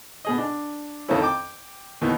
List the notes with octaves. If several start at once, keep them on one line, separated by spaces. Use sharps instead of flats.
B2 G#4 D#5
D4
F2 D#3 A3 A#3 C#4 E4
G5 D6
D#2 B2 D#3 E3